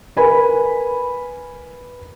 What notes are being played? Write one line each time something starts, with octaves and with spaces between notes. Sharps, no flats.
A#4 B4 G#5 B5